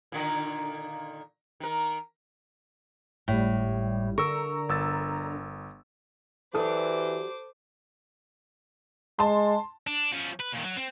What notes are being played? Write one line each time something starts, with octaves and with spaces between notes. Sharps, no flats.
A#2 D3 D#3
D#3 A#4
G#1 A2 G3
D3 A#4 A#5 C#6 E6
G1 E6 A6
E3 F#3 D4 G4 A4 C5 D6 D#6
G#3 A5 C6
D4
F3 C#4
B4
A#2 D#3
F#3
C4